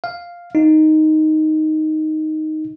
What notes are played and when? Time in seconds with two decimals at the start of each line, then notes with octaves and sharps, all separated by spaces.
0.04 F5
0.55 D#4